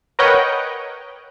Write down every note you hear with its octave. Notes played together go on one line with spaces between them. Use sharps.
A#4 B4 C#5 D#5 F#5 G5